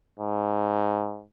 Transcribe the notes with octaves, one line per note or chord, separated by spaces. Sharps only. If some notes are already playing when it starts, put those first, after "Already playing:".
G#2